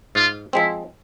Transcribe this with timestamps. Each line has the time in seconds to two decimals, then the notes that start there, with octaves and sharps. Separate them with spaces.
0.15 G#2 F4
0.53 F3 G#3 C4 E4